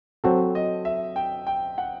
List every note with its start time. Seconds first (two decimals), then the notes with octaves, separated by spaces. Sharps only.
0.24 F#3 C4 F#4 A4 C5
0.55 D#5
0.85 E5
1.16 G5
1.47 G5
1.78 F#5